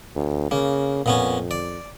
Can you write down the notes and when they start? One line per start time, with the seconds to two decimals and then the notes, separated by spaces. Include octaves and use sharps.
0.15 D2
0.51 C#3 A#3
1.06 F2 A#2 B3 C#4
1.51 D5